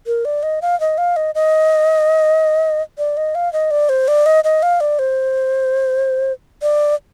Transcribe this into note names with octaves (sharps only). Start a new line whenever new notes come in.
A#4
D5
D#5
F5
D#5
F5
D#5
D#5
D5
D#5
F5
D#5
D5
C5
D5
D#5
D#5
F5
D5
C5
D5